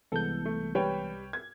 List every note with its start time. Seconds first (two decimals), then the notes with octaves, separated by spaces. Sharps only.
0.12 C2 E3 G#3 B3 A4 G6
0.45 A3
0.75 G3 B4 C#5 G5
1.33 G#6